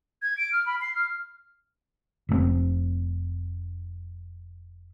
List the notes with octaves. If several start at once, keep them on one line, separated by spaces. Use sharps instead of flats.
G#6
D7
F6
B5
C7
F6
F1 C3 C4